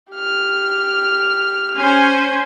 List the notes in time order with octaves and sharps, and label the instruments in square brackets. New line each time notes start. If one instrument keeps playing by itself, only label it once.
[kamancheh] G4 F6
[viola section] C#4 C5 G#5